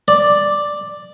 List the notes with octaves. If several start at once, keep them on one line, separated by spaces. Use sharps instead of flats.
D5